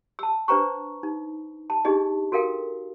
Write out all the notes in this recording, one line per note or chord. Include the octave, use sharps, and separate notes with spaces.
A5 E6
D4 B4 C5 G5 A#5 C#6
D#4
A5
D4 D#4 G4 G#4 D#5
F#4 A4 A#4 F5 G5